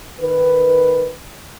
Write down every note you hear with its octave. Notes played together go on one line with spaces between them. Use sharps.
D#3 B4